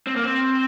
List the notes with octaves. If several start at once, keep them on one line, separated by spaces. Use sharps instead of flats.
C4
A#3
C4